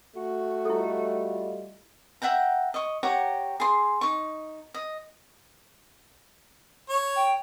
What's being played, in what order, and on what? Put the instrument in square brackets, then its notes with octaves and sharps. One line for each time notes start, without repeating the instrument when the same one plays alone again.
[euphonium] A3 [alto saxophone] F#4
[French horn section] G3 F4 D#5 [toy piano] E4 A4
[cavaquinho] E5 F#5 G5 A#5
D#5 C#6
G4 C#5 F#5 A#5
G#4 C6
D#4 C#6
D#5
[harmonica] C#5
[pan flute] G5